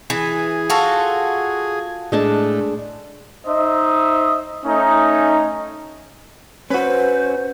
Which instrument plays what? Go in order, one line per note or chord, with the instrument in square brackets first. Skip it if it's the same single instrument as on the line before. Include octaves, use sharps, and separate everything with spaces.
[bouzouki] E3 [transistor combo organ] G#4
[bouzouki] F4 F#4 A4
[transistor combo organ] A2 [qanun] G#3 D4 A5
[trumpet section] D#4 C5 D#5 E5
A3 C#4 D#4
[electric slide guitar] C#4 F#4 [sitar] B4 [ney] C5